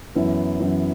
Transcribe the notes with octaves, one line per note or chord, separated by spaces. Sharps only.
F#2 E3 B3 E4
F#2 E3 B3 E4